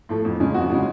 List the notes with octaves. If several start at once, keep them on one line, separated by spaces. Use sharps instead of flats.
A2 F3 A3
F2
C#3 G#3 C#4
F2 F#4
C#3 G#3 C#4